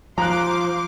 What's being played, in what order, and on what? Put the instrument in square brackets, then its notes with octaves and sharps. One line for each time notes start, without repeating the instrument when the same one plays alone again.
[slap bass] F3 [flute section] C5 F5 [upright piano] A#5 F#6 [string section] C6 D6